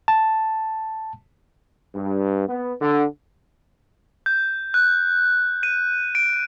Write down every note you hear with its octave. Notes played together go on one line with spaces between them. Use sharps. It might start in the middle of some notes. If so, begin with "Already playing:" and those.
A5
G2
B3
D3
G6
F#6
D#7
D7